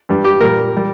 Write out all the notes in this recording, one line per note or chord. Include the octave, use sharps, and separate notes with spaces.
G2 G3
G4
A#2 G3 A#4
G3